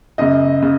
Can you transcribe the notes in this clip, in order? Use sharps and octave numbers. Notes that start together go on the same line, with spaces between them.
F#2 C#3 D#5
C#3